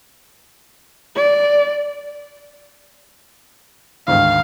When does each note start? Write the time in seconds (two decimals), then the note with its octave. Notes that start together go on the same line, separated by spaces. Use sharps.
1.16 D5
4.08 D2 G#2 D#3 F5